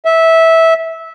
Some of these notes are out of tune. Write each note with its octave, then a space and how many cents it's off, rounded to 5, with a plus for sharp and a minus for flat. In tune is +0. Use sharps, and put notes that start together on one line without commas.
E5 -15